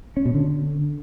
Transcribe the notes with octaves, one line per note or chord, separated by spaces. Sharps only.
C#4
B2
D3